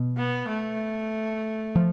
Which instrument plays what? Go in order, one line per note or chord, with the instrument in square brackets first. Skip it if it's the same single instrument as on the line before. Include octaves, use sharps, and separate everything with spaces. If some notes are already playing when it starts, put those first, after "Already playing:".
Already playing: [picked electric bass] B2
[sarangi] B3
A3
[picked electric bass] F3